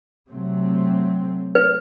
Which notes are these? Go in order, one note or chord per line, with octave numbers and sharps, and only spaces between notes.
C3 F#3 A3 C4
B4